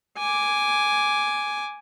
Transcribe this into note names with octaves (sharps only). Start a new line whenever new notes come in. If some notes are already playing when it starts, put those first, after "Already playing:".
G#5 D6